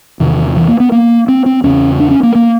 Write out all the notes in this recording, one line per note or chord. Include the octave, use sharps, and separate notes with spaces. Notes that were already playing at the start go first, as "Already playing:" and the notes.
E2 C3 D#3
E3
A#3
B3
A#3
C4
C4
E2 C#3 C#4
D4
C#4
A#3
A#3